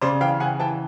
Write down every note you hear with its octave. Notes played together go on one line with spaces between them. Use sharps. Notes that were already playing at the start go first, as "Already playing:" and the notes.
C#3 C5 D5
E3 F5 G5
C#3 F#5 G#5
E3 G5 A5